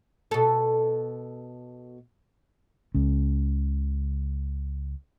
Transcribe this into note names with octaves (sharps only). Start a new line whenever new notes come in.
B2 A4
C#2 C#3